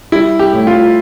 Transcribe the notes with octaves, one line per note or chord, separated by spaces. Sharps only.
G3 E4
G4
A2
F4